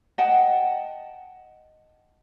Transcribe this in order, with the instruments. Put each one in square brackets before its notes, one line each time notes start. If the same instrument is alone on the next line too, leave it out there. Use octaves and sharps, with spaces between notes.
[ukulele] D#5 F#5 G5 A5